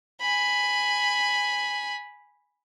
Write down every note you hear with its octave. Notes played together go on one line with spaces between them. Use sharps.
G#5 B5